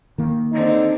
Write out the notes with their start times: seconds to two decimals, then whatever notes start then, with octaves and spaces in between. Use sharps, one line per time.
0.18 D#3 A#3
0.52 D3 C4 D#4